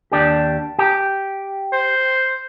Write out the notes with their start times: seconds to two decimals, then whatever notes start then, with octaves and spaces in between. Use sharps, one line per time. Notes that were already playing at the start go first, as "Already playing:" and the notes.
0.12 D#2 D4 G4
0.79 G4
1.73 C5